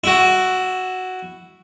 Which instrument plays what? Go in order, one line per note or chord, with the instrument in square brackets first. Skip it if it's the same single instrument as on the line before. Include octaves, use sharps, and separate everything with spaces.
[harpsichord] E4 F#4